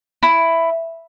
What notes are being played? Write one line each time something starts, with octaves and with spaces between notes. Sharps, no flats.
E4